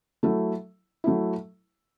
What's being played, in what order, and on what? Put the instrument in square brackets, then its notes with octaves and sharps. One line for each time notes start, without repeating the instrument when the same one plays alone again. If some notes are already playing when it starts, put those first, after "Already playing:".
[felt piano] F#3 A3 E4
F#3 A3 E4